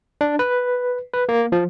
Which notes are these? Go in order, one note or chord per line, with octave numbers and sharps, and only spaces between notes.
D4
B4
B4
A#3
F3